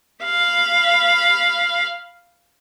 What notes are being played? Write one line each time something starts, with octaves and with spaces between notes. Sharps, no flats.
F5 B5